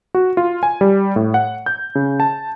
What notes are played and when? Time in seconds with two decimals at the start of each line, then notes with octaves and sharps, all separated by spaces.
0.15 F#4
0.37 F4
0.63 G#5
0.81 G3
1.16 A2
1.34 F#5
1.66 G6
1.95 C#3
2.20 A5